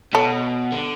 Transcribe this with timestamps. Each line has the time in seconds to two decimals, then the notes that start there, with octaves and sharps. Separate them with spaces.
0.14 B2 A4 C#5
0.72 D3